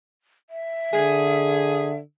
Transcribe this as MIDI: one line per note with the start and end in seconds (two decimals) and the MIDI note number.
0.50 1.95 76
0.94 2.00 50
0.94 1.88 68